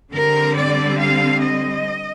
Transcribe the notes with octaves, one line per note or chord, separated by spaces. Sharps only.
D3 G3 C4 A#4
D5
F5
D#5